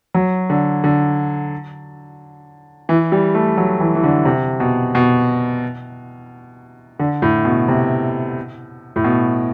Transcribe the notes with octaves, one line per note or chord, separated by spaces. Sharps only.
F#3
D3
D3
E3
G3
A3
F#3
E3
E3
D3
C3
B2
B2
D3
A2
B2
C3
A2
B2